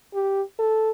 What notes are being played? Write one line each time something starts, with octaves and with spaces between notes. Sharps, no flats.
G4
A4